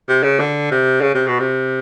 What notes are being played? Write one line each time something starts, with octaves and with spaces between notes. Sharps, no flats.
C3
C#3
D3
C3
C#3
C3
B2
C3